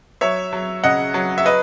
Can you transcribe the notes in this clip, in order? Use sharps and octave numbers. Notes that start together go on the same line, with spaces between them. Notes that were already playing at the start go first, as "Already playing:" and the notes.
F#3 C#5 E5
F#3
C#3 D#5 F#5
F#3
E5
B4 D#5